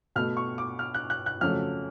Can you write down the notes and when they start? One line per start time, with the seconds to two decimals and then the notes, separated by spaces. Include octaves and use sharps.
0.16 B2 A3 F6
0.37 C#6
0.58 D6
0.79 F6
0.94 F#6
1.10 F#6
1.26 F#6
1.41 F2 C#3 F#3 A3 F6